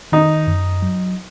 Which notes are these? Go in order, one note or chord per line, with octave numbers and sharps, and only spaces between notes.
D#3 D#4
F#2
F#3